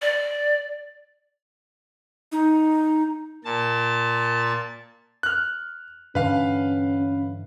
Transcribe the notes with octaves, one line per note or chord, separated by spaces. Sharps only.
D5
D#4
A#2 A5
F6 F#6
G2 D3 E3 C#4 B4 F5